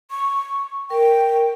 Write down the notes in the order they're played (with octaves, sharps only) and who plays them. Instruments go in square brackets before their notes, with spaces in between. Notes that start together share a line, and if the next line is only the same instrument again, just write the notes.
[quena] C#6
[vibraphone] A#4 [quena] G5